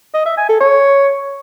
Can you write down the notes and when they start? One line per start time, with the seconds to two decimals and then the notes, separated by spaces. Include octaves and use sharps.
0.14 D#5
0.26 E5
0.37 G#5
0.49 A4
0.60 C#5